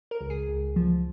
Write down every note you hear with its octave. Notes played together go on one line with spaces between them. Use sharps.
A#4
C#2
G#4
C#2
F3